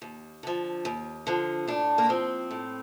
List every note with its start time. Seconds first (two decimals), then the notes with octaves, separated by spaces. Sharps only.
0.02 D#2
0.43 D3 F3
0.85 D#2
1.27 D3 F3
1.68 A2 D4
1.98 A#3
2.09 F3 C4
2.51 A2